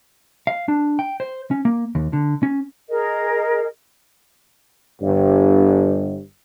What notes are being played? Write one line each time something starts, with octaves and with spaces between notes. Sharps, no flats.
F5
D4
G5
C5
C#4
A#3
D#2
D3
C#4
G#4 A#4 D#5
G1 G2